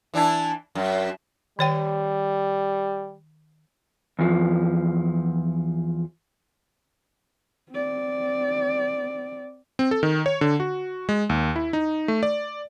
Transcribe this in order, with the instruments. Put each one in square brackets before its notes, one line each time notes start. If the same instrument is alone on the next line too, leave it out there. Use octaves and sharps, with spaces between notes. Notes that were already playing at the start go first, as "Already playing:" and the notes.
[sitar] E3 D4 E4
F#2
[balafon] D#3 C#5 G5 [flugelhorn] G3
[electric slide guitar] E2 F3
[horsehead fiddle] C4 D5
[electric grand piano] C4
A4
D#3
C#5
D3
F#4
G#3
D#2
E4
D#4
A3
D5